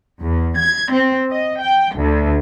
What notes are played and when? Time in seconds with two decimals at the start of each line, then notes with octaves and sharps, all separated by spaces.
0.21 E2
0.57 G#6
0.92 C4
1.31 D#5
1.61 G5
1.94 D2